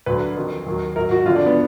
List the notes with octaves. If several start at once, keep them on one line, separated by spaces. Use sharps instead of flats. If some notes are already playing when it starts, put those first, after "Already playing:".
D2 D3 F#3 B4
F2 D#3 F#3
D#2 D#3 F#3
G#2 F#3 A#4
F#4
F2 D3 F3 F4
D4
B3